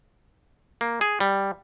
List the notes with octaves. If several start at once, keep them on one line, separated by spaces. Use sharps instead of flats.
A#3
G#4
G3